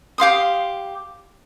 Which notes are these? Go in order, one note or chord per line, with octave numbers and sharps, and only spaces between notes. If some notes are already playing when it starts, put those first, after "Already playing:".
G4 F5 C6 D#6